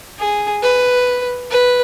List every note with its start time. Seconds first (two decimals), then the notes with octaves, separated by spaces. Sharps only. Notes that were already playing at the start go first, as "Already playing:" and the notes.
0.19 G#4
0.62 B4
1.51 B4